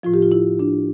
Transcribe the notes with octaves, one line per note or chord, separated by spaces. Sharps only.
A2 F3 F4
G4
F4
E4
D4